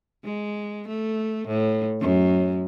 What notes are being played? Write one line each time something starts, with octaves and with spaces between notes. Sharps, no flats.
G#3
A3
A2
F#2